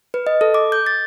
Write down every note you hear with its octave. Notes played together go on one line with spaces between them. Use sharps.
B4
D#5
A4
D6
G6
A6